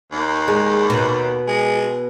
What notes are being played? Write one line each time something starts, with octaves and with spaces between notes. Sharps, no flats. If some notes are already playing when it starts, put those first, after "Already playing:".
D#2
G#3
B2
G#3